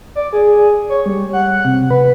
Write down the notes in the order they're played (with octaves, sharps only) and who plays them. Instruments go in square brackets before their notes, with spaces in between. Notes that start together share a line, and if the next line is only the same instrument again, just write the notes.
[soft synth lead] D5
G#4
C#5
G3
F#5
C3
B4